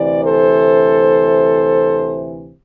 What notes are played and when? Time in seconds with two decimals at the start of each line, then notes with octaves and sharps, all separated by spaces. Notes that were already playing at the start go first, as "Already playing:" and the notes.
Already playing: D2 C3 E3 D5
0.23 A4 C5